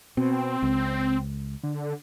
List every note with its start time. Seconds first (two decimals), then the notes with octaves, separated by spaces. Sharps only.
0.17 B2 C4
0.63 C#2
1.63 D3